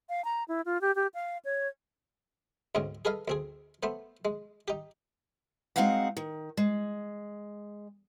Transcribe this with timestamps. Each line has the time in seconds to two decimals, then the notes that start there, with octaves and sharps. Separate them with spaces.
0.09 F5
0.25 A#5
0.48 E4
0.66 F4
0.81 G4
0.96 G4
1.14 F5
1.45 C#5
2.75 D2 G#2 C4 C#4 D#5
3.05 G#4 A4 B4 D#5 F5
3.28 D2 C4 G#4
3.83 A3 B3 C5
4.25 G#3
4.68 D#4 G4
5.76 G#3 C4 D#4 F#4 F5 F#5
6.17 D#3
6.57 G#3